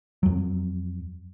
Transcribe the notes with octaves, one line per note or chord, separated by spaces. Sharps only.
F2 F#3